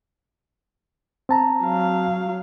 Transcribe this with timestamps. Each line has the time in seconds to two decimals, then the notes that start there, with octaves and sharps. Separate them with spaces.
1.29 C4 A5 A#5
1.64 F#3 F5